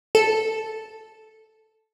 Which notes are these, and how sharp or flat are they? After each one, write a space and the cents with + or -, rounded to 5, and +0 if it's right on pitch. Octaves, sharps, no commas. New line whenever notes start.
A4 -5